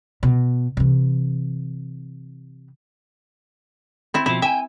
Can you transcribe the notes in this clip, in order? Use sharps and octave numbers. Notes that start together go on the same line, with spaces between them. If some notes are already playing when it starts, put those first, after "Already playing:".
B2
C3 E3
C4 E4
B2 F3 E4
E5 G5 G#5